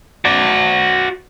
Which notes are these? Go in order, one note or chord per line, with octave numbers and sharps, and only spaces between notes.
F#4 D5